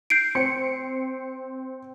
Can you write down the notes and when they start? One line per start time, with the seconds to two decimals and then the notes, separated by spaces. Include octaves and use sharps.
0.10 G6 C7 D7
0.35 C4 C#7